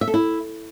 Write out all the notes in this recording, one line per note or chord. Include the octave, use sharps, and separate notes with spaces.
E5
A4
E4